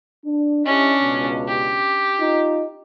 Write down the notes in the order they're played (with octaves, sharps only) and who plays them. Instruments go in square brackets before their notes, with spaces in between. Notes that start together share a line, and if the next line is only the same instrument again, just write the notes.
[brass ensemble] D4
[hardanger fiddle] C#4 D4 [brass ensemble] E4 G4 D#5
[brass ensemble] C#2 B2
[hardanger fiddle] G4
[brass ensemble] D#4 F4